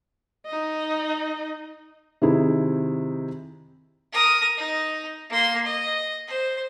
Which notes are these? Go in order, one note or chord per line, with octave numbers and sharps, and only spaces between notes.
D#4 D#5
C3 D#3 E4 G#4
A#4 D#6
D#4
A#3 C6
D#5
C5